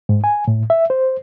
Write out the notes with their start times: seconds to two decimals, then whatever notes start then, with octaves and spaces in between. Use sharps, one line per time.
0.09 G#2
0.24 G#5
0.48 A2
0.70 E5
0.90 C5